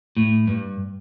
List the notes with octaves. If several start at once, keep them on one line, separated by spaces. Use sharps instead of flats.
A2
G2